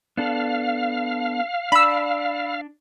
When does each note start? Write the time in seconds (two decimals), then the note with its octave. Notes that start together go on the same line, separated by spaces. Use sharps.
0.17 B3 D4 A4 F5
1.72 D4 B5 E6